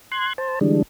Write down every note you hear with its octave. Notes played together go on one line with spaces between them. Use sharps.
C6 F#6 G#6
C5 A5
D3 E3 G3 G#3 D4